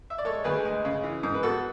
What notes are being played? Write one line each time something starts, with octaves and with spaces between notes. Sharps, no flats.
E5
D5
G#3 A4 C#5
D2 G#4 B4
G#3
C#3
E3
G#2
B4
B3 F#4 A4